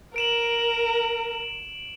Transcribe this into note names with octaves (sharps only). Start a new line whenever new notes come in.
A#4 D7 E7 F#7